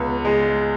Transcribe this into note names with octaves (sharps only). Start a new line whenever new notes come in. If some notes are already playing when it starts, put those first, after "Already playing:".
Already playing: C#2 B3
G#3